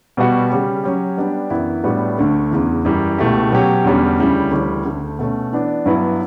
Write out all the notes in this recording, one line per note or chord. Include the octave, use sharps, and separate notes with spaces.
B2 G3 B3 F#4
C#3 G3 C#4 G4
F#3 C#4 G4
G3 B3 D4 G4 D5
F#2 E3 B3 E4
A2 G3 B3 D4 F#4
D2 D3 A3
E2 C#3 E3
F#2 E3 G3
C#2 B2 A3 E4 G4
B2 F#3 C#4 G4 C#5
E2 D3 G3 C#4 F#4
D2 C#3 G3 C#4 E4
D2 C#3 E3 G3
D2 D3 A3
B2 A3 C#4
E3 B3 D4
G2 F#3 B3 E4 B4